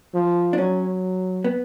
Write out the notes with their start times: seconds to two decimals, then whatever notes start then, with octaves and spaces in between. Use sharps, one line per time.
0.14 F3
0.53 D4
0.58 F#3 C#4
1.44 B3